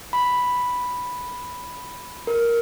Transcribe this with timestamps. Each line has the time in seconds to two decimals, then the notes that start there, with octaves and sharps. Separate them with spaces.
0.13 B5
2.27 A#4